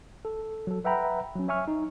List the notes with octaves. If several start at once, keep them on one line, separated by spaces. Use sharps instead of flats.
A4
F#3 A4
B4 E5 F#5 G5 A#5 B5
F#3 C#4
C#5 E5 G#5 C#6 F6
D#4